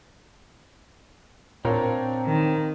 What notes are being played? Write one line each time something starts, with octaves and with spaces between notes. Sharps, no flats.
A#2 C4 D4 F4 A#4 C#5
D#3